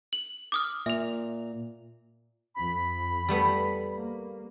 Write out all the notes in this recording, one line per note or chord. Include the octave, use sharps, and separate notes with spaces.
F#7
D6 D#6 F6
A#2 E5 F7
F2 B5
G3 A3 B3
A#3